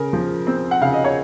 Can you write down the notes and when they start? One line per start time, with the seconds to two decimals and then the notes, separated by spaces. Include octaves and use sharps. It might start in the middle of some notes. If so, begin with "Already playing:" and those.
Already playing: C#3 A#4
0.13 F3
0.47 C4
0.71 F#5
0.81 C#3 F5
0.93 D#5
1.04 C#5